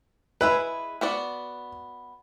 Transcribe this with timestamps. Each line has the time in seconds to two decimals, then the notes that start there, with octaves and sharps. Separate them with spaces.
0.41 G#3 E4 G#4 B4
1.01 B3 F#4 D5